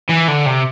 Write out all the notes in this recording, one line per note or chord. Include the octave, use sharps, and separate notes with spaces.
E3
D3
C3